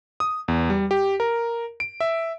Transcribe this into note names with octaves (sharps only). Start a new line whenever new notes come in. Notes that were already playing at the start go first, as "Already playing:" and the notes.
D#6
E2
G3
G4
A#4
D7
E5